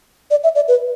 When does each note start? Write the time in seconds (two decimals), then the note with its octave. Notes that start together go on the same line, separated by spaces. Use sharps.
0.31 D5
0.44 E5
0.55 D5
0.68 B4